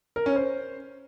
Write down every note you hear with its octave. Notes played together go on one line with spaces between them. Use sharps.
A#4
C#4
C5